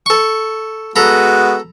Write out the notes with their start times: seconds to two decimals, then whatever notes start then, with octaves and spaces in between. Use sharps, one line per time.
0.06 A4 C#6
0.96 G#3 B3 F#4 A4 A#5 B5